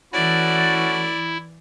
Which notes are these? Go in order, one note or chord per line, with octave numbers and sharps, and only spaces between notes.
E3 A3 C#4 E4 F#4 D5